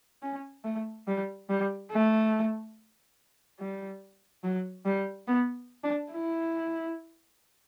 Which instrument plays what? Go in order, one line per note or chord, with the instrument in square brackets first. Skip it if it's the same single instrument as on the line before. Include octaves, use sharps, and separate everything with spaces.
[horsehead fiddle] C#4
A3
G3
G3
A3
G3
F#3
G3
B3
D4
E4